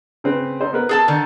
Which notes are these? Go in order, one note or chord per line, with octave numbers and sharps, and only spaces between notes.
C#3 C4 B4
D#4 A4 C5
B3 A#4 B4
G#4 A4 A5
D3 D#3